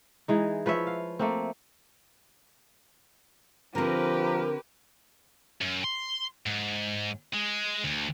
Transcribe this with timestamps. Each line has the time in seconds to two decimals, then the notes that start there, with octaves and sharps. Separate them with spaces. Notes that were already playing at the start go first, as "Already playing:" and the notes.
0.28 E3 G#3 D#4
0.66 F3 B4 C#5 E5
0.87 F5
1.19 A3 A#3 C4
3.75 D3 F3 C4 G4 A#4 B4
5.61 F#2
5.84 C6
6.46 G#2
7.34 G#3
7.84 D2